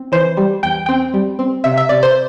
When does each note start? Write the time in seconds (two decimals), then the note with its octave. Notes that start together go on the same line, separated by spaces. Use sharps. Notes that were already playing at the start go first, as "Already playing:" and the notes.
Already playing: C4
0.12 E3 C5
0.37 G3
0.63 E2 G5
0.86 C4 G5
1.14 G3
1.39 C4
1.64 C3 E5
1.77 E5
1.89 C3 D5
2.03 C5